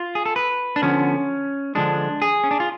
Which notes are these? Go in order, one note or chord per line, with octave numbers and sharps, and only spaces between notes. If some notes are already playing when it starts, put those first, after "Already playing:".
Already playing: F4
G#4
A4
B4
D4
D3 F3 B3 C#4
D3 F3 G#3 D4
G#4
C#4
D4
F4